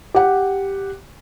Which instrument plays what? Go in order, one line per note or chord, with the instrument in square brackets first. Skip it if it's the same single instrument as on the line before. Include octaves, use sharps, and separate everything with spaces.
[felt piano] G4 F#5